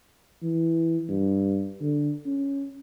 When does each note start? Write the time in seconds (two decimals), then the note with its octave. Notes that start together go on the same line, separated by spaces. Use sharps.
0.42 E3
1.09 G2
1.81 D3
2.25 C#4